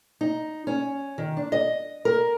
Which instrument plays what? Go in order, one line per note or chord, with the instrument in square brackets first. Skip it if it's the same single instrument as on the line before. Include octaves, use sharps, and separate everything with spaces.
[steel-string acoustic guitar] D#4
C#4
D#3
D4
D#5
A#4